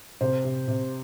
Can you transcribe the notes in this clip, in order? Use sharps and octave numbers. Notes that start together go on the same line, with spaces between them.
C3 C5
C3
C3